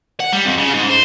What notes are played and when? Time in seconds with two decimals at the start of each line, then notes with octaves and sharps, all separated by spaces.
0.20 F#5
0.33 G3
0.45 F2
0.58 C#3
0.73 G#2
0.90 C5